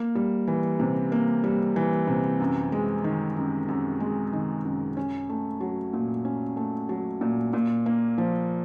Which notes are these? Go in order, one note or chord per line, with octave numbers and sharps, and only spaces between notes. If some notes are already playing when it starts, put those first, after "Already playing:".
Already playing: A#3
G3
E3
C3
A#3
G3
E3
C3
F#2
G#3
D#3
F#2
F#2
G#3
D#3
F#2
C#4
A3
F#3
A#2
C#4
A3
F#3
A#2
A#2
A#3
F3